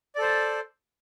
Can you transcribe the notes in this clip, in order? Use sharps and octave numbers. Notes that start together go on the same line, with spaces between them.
A4 C5 D5